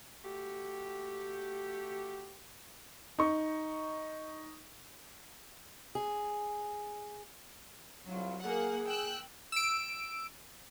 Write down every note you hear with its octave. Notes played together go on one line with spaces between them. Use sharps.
A3 F#4 G4
D#4 C#6
G#4
C2 F#3 F4
A#3 G#4 F#5
G5 E6 F#6
E6 D7